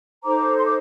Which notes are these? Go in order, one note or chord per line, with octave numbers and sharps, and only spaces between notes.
D#4 A4 C5 A#5 D6
C6
D6